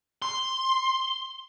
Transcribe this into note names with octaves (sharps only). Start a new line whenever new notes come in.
C6